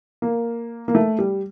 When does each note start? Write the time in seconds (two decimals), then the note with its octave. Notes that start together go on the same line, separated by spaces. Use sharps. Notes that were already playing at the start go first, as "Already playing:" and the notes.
0.22 A#3
0.88 A#3
0.95 A3
1.19 G3